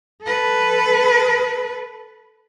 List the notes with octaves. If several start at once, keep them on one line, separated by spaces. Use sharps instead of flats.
A4 B4